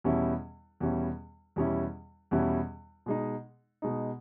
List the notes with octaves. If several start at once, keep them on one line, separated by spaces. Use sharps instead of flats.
E2 B2 G3 C#4 E4
E2 B2 G3 C#4 E4
E2 B2 G3 C#4 E4
E2 B2 G3 C#4 E4
B2 G#3 D#4
B2 G#3 D#4